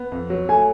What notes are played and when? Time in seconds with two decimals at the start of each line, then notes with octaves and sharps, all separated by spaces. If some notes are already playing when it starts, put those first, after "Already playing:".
Already playing: B3
0.12 F2
0.30 F#3
0.49 A3 G#5